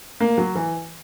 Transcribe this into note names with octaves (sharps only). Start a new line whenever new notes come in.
A#3
F#3
E3